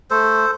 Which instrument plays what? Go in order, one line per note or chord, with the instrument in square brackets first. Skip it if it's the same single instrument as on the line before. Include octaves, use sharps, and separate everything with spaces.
[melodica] A3 A4 C5